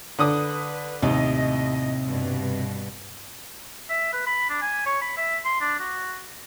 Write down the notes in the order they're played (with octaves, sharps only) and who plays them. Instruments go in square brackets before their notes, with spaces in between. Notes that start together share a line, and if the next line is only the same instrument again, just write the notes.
[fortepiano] D3 D6 D#6 [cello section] B4
[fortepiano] D#2 [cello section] A2 D#5 [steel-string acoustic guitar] C3
[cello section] G2 B2
[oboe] E5
B4
B5
D4
G#5
C#5
B5
E5
C6
D4
F#4